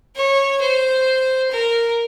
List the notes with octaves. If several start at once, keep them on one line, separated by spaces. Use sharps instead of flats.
C#5
C5
A#4